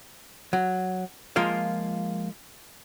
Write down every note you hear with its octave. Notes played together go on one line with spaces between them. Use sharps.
F#3
F3 G#3 A#3 F4 A#4 F5